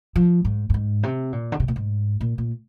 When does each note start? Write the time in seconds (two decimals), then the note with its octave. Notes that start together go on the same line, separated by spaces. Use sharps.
0.16 F3
0.45 G#2
0.70 G2
0.74 G#2
1.03 C3
1.32 A#2
1.52 D3
1.60 C3
1.68 A#2
1.76 G#2
2.20 A#2
2.38 A#2